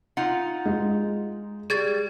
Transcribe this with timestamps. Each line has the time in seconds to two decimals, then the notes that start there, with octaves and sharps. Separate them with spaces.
0.17 D#4 F4 F#5
0.66 G#3
1.70 G3 G#4 G#6 A6